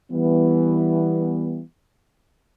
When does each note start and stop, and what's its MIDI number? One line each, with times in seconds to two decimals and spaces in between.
0.12 1.61 52
0.12 1.61 55
0.12 1.61 59